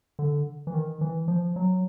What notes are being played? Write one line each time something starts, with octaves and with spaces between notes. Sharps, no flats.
D3
E3
D#3
E3
F3
F#3